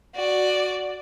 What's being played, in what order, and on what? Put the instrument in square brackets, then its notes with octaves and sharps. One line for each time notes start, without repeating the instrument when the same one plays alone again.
[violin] F#4 D5